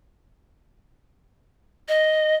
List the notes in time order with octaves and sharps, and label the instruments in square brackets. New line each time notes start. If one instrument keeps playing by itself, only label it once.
[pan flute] D#5